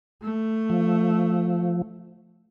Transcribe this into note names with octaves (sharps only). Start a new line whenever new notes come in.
A3
F3